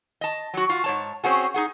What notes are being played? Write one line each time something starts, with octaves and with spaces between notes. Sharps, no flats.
D#5 A5
F#3 F#4
F4 F#4
G#2 C#5 A5
C4 C#4 F#4 G#4
D#4 G#4 F#5